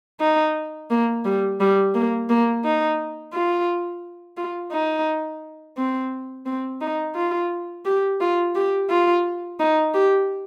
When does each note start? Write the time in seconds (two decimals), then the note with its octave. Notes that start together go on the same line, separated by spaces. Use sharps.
0.20 D#4
0.90 A#3
1.25 G3
1.60 G3
1.94 A#3
2.29 A#3
2.64 D#4
3.33 F4
4.37 F4
4.72 D#4
5.77 C4
6.46 C4
6.81 D#4
7.15 F4
7.85 G4
8.20 F4
8.55 G4
8.90 F4
9.59 D#4
9.94 G4